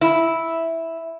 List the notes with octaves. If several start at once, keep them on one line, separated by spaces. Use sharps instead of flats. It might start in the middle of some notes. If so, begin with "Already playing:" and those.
E4